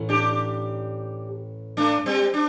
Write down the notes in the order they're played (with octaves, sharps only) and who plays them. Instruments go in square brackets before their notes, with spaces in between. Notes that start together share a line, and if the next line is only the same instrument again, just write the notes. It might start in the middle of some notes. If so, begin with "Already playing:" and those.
Already playing: [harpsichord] A1
[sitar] D4 G4
A3 D4
G3 C4
D4